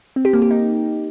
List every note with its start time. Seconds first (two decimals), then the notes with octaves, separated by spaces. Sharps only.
0.16 C4
0.25 G4
0.33 A#3
0.42 G4
0.51 D#4